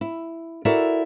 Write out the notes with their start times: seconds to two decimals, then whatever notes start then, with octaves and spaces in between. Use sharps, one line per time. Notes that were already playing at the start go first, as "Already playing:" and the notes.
0.01 E4
0.65 E4 F#4 A4 A#4 D5 E5